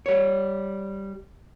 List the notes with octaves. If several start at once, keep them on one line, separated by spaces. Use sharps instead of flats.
G3 C#5